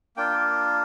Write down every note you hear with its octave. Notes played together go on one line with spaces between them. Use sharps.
A#3 D4 F4 G5